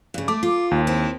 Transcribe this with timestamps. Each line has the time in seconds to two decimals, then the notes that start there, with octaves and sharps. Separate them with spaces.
0.14 G2 C#3
0.28 A3 D6
0.43 F4
0.71 D#2
0.87 C4 E4